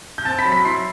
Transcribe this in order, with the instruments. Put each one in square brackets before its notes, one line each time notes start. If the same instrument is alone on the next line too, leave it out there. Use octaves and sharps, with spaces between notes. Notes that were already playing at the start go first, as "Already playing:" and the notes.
[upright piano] G6
C4 A5 A6
B5 B6
F#3
B5 B6
E4 C6 C7